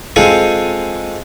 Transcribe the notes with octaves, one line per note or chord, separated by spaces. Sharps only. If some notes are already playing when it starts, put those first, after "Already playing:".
G#3 C4 F4 A4 G#5